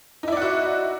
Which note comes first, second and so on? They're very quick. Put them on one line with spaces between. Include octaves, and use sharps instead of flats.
D#4 E4 D5 F#5 F#4